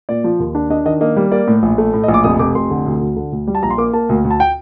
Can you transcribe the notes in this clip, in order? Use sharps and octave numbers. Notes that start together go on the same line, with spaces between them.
A#2 D5
F3
D#2
D4
D4 D#5
D#3 D#5
A#3 D#5
G3
A#3 D5
A2
A#1
A3
A2
D#5
A#1
D6
F1 D#6
F1 D6
F1 C6
D3
D2
D2
D3
D2
G3
A5
A#1 A#5
C6
A#3 D6
A#3 A5
D2
D2
A5
G5